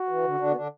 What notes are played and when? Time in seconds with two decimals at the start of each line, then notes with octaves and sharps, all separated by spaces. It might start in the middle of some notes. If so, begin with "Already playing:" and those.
Already playing: F#4
0.09 E3
0.24 D3
0.40 D3 D4
0.51 B3
0.56 D3 D4